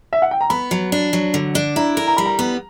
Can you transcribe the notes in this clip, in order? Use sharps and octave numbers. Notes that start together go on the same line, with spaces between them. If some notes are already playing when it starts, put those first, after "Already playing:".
E5
F#5
G5
A#5
B3 B5
F#3
D4
F#3
D3
D4
E4 A#5
A#4
A#5
G3 B5
A#5
B3